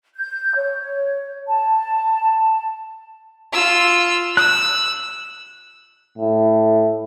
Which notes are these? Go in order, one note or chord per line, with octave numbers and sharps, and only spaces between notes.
G6
C#5
A5
F4 E6
E6 F#6
A2